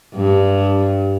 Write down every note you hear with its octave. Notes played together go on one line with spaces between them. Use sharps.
G2